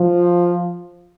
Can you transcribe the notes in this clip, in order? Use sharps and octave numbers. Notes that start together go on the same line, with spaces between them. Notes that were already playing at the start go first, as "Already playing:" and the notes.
Already playing: F3